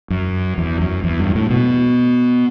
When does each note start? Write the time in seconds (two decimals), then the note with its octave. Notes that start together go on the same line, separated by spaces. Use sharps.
0.10 F#2
0.58 E2
0.81 F#2
1.04 E2
1.20 G2
1.35 A2
1.50 B2